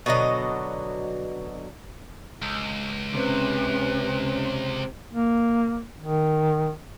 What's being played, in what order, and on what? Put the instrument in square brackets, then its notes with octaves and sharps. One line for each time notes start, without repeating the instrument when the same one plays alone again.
[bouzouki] B2 D3 F#3 D#5
[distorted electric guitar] C#2
[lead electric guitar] C3 [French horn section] C#4 [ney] B4
[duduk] A#3
D#3